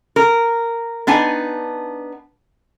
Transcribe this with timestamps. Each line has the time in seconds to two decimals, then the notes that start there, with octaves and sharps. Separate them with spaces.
0.16 A#4
1.07 B3 D4 D#4 G#5